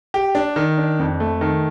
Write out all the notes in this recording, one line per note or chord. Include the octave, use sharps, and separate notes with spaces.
G4
D4
D#3
D4
F2
A3
D#3